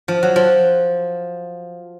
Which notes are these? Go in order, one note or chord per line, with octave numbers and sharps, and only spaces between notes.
F3
F#3
F3